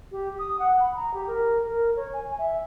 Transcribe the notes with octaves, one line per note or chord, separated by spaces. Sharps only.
G4
D#6
F#5
B5
A#5
G4
A#4
A#4
C#5
G#5
E5